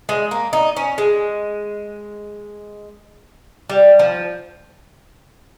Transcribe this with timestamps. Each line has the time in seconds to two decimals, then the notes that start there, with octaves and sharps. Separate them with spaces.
0.09 G#3
0.31 A#3
0.53 D#4
0.77 C#4
0.98 G#3
3.70 G3
3.99 F3